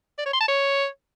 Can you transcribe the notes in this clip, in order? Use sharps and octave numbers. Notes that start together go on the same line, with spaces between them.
D5
C#5
C6
A5
C#5